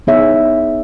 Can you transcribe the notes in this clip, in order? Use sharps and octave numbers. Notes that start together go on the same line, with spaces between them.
B3 D#4 G#4 C#5 E5